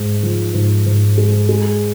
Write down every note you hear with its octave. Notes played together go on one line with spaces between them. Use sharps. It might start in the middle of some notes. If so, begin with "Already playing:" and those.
Already playing: G#2 G#3
F3
G#2
G#2
G#3
G#3